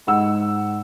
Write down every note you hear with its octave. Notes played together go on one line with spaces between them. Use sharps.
G#2 F#5 E6